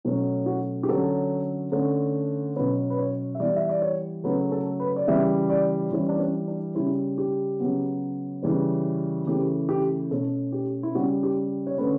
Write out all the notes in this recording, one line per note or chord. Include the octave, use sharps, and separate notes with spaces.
B2 F#3 A3 C#4 F#4
F#4
G4
D3 F#3 C#4 A4
D3 A3 C#4
B2 F#3 C#4 B4
B4
C#5
E5
E3 G3 B3 D5
E5
D5
C#5
C#3 F#3 A3 B4
A4
B4
D5
C#3 E3 G3 E5
D5
E3 G3 C#4 E4
D4
C#4
D4
C#3 G3 C#4 E4
G4
C#3 F#3 B3
C#3 E3 G3 C#4
C#3 E3 A3 C#4 G4
G4
B2 A3 C#4 A4
G4
E4
C#3 G3 C#4 F#4
G4
C#5
D3 A3 C#4 B4